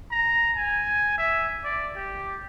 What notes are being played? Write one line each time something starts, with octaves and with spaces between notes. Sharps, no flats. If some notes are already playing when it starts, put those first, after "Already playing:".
A#5
G#5
E5
D5
G4